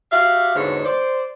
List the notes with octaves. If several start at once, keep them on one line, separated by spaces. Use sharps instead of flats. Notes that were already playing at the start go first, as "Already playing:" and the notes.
F#4 G4 E5 F5
E2 G#2 B2 D3 C5 C#5
C5 D5